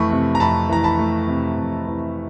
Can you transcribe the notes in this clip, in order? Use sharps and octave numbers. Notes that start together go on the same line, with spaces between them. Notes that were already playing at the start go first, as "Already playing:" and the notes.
Already playing: F2 E3 A3 B5 C#6
C3
A#5
F2 A5 B5
E3 A#5
A5 B5
A3
C3
F2
E3